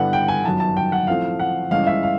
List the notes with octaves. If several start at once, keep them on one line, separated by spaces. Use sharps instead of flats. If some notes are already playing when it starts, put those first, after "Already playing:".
Already playing: G2 D3 G3 B3 E4 F#5
G5
G#5
G1 F#2 D#3 F#3 A5
A5
G5
F#5
A2 F3 A3 C4 F5
F#5
G1 G2 E3 G#3 C#4 F5
E5
F5